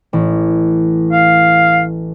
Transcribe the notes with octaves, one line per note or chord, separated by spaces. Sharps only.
A1
F5